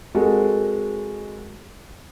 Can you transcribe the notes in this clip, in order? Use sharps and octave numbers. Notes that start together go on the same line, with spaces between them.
G#3 C4 F#4 A4 A#4